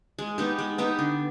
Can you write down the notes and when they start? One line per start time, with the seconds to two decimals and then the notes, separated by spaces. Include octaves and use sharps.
0.19 G#3
0.38 B3 D#4 G4
0.59 G#3
0.78 B3 D#4 G4
0.99 D3